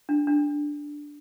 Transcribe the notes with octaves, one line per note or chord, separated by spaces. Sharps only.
D4
D4